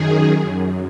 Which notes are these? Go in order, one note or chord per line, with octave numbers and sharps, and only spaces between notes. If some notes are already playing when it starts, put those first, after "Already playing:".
Already playing: F#2 D#3 G#4
F#2